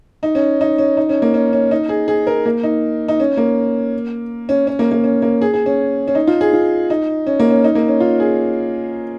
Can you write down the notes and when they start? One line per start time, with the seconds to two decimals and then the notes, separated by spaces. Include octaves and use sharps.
0.23 D#4
0.35 C#4
0.61 D#4
0.78 C#4
0.97 D#4
1.09 C#4
1.22 A#3
1.34 C#4
1.53 C#4
1.71 D#4
1.89 G#4
2.08 G#4
2.27 A#4
2.46 A#3
2.63 D#4
3.08 D#4
3.20 C#4
3.37 A#3
4.49 C#4
4.67 C#4
4.79 A#3
4.92 A#3
5.04 C#4
5.22 A#3
5.41 G#4
5.53 G#4
5.66 C#4
6.08 C#4
6.15 D#4
6.27 F4
6.41 G#4
6.53 F4
6.90 D#4
7.27 C#4
7.40 A#3
7.51 C#4
7.64 D#4
7.75 A#3
7.88 C#4
8.00 F4
8.20 G#4